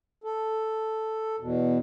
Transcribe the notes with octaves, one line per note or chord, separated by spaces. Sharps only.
A4
E2 B2